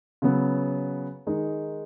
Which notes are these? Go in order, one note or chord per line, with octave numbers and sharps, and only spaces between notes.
C#3 F#3 B3
D#3 G#3 D#4